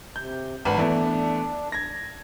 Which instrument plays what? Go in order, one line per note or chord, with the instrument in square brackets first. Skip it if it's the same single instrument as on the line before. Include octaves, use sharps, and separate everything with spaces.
[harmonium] C3 [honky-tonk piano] G6
[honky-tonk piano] G#1 B4 F#5 [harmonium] D4
[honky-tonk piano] E3 A3 B3
G#6 A#6